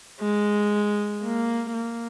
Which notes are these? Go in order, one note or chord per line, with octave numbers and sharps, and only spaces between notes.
G#3
A#3
A#3